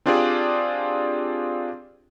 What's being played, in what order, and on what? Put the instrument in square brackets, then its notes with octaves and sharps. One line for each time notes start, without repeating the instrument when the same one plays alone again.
[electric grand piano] C4 D4 F4 G4 G#4 D5